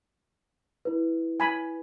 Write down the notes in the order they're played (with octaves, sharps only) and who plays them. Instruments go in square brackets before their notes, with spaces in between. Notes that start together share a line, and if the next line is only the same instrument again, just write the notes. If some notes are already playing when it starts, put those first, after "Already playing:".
[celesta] E4 B4
[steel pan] G#5 B5